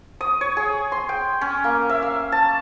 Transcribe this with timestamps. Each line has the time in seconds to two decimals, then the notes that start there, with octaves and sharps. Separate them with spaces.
0.21 D#6
0.41 C#5
0.57 G#4
0.92 C6
1.09 G5
1.41 C#4
1.64 A#3
1.89 E5
2.03 F5
2.32 A5